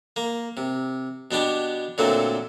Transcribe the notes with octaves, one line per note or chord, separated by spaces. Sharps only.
A#3
C3
B2 B3 D4 G4
A#2 D3 F#3 A3 C4